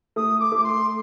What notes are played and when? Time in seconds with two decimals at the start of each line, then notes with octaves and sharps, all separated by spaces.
0.16 A3 D#6
0.39 D6
0.52 A3
0.58 D6
0.63 C6